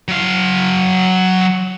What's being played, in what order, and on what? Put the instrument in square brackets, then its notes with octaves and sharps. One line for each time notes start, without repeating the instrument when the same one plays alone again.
[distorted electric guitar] F#3 F5